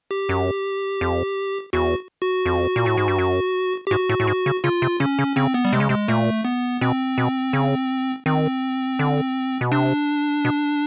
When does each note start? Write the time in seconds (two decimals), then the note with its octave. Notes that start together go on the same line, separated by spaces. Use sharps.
0.11 G4
0.29 F#2
1.01 F2
1.73 E2 F#4
2.21 F#4
2.46 F2
2.76 A#2
2.86 A2
2.97 G#2
3.08 G2
3.18 F#2
3.87 G4
3.91 G#2 F#4
4.09 A2
4.20 A2
4.27 G#2
4.46 C#3
4.64 C#3 F4
4.82 C3
5.00 C#3 C#4
5.19 C#3
5.36 C#3 C4
5.54 B3
5.65 G3
5.73 C3 G#3
5.80 C#3
5.89 C3 G#3
6.08 A#2 A3
6.45 B3
6.81 B2 C4
7.18 B2
7.53 C#3
8.26 D#3 C4
8.99 D3
9.61 B2
9.72 C3 D4
10.45 B2